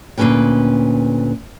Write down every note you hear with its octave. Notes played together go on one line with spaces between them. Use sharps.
D2 A#2 G#3 C#4 B4 G5